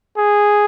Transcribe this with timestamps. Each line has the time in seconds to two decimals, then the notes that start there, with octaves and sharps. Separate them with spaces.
0.17 G#4